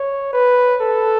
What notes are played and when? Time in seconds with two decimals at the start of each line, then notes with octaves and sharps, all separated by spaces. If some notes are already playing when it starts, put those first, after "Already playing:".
Already playing: C#5
0.33 B4
0.81 A4